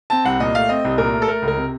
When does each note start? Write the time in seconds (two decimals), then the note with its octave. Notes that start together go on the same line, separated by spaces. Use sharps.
0.10 C4 A5
0.25 C2 F#5
0.40 A#2 D#5
0.54 A3 F5
0.69 C4 D#5
0.84 C2
0.98 A#2 A#4
1.13 A3
1.22 A4
1.28 A3 A#4
1.42 C#2
1.48 A#4
1.57 C3